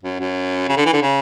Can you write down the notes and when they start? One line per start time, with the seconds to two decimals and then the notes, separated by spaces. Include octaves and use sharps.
0.03 F#2
0.20 F#2
0.69 C#3
0.77 D3
0.86 E3
0.93 D3
1.02 C#3